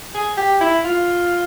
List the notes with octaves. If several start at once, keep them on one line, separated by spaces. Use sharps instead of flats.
G#4
G4
E4
F4